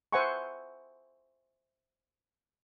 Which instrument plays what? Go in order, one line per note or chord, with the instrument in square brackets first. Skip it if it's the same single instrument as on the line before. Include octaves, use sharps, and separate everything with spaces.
[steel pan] C5 E5 F#5 G#5 B5 C#6